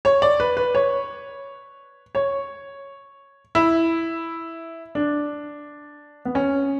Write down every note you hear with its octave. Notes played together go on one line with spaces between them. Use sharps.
C#5
D5
B4
B4
C#5
C#5
E4
D4
B3
C#4